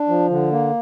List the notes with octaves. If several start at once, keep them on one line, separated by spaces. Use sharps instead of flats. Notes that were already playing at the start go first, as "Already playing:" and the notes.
Already playing: D4
F3
D3
A#3